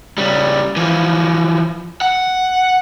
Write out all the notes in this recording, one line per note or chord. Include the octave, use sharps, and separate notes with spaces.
C#3 G3
E3 F3
F#5